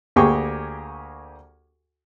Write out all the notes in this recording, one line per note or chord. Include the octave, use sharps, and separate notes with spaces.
D2 A#3 G4 G#4 G5 C#6